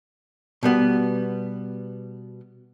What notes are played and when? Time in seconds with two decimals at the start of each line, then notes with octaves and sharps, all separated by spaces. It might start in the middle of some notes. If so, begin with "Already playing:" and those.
0.63 B2 G3 B3